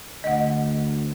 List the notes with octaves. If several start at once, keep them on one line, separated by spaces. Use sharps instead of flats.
D2 D#5 F#5